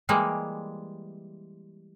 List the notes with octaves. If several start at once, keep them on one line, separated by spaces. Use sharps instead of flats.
E3 G3 G#3 A#3